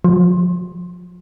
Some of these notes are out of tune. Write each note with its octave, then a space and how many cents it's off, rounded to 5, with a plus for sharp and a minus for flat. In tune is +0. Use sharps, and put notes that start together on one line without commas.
F3 +25